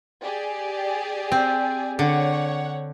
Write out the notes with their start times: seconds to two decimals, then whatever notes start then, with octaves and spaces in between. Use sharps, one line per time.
0.22 G4 G#4 D5
1.32 C4
1.99 D3 C#5 F#5